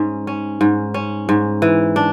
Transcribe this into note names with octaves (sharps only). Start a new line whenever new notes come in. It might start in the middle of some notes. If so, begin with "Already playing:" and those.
Already playing: G#2 C#4
C#4
G#2
C#4
G#2
E3
D4